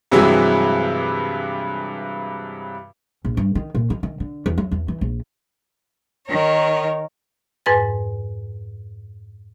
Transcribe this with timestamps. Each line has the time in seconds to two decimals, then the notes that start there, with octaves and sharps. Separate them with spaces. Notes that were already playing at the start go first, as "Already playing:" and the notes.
0.12 G2 C3 E3 F#3 G#3 E4
3.25 A#1
3.37 G2
3.55 D#3
3.75 A#2
3.90 D#3
4.03 D#3
4.20 D3
4.46 E2
4.58 F#3
4.71 E2
4.88 E3
5.01 A#1
6.28 D#3 A#4 C#5
7.66 F2 G#2 B4 G#5 A6